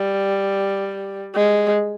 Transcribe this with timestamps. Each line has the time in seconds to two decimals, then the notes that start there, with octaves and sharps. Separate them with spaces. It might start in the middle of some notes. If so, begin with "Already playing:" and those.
Already playing: G3
1.35 G#3